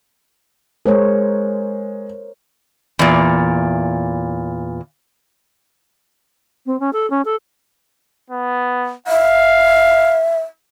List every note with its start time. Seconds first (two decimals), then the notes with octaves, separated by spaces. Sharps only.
0.86 G#3 A#4 C5 C#5
2.99 E2 A#2
6.66 C4
6.80 C#4
6.93 A4
7.10 C#4
7.25 A4
8.30 B3
9.08 E5 F5